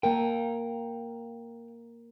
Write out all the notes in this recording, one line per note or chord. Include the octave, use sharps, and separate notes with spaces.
A#3 A#4 F5 G5